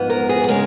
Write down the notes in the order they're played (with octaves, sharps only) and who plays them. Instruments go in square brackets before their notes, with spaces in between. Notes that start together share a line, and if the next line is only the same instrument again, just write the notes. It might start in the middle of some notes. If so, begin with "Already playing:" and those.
Already playing: [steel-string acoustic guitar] G#2 F3 B3
A#4
G#4
G#4
C#3 G#3 A#4